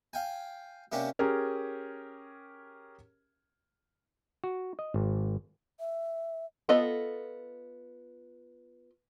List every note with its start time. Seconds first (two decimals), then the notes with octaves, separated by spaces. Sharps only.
0.13 F5 G5 G#5
0.92 C3 A#3 C#4 D4 G4
1.19 C#4 G4 G#4 A#4
4.44 F#4
4.79 D#5
4.94 G#1
5.80 E5
6.69 B3 F4 A4 D#5